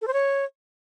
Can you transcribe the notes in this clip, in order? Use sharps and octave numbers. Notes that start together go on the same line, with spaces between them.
A4
C5
C#5